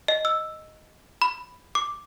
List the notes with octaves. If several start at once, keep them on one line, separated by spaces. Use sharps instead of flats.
D#5
E6
B5
D6